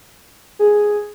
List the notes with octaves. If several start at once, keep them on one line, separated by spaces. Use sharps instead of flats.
G#4